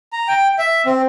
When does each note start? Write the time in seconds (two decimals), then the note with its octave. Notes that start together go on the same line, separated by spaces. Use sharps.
0.13 A#5
0.28 G5
0.59 E5
0.86 C4